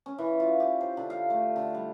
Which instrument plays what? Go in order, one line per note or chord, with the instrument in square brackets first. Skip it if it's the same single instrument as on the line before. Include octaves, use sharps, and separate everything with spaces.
[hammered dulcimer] C#4
E3
F4
G4
C5
D3
F5
A3
D3
G3